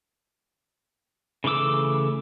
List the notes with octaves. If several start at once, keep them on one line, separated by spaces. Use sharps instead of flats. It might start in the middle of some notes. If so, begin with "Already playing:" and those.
C#3 E3 A3 D6 E6